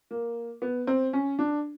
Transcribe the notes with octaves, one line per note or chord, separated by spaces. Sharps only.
A#3
B3
C4
C#4
D4